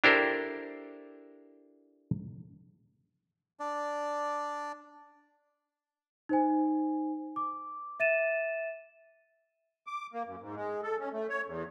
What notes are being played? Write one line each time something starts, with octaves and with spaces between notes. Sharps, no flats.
D4 E4 G4 A4 A#4 C5
D4 D5
D#4 C5 G#5
D6
E5 A6 D#7 E7
D6
A#3
F#2
G#2
G#3
A4
C#4
A3
C#5
E2